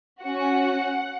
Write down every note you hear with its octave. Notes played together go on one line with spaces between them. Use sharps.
C#4 F#4 F#5